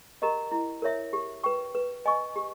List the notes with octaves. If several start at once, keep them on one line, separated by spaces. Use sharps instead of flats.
G4 A#4 D#5 A#5
E4
A#4 C#5 E5
G4
B4 G5 C#6
B4
D#5 G#5 C#6
G4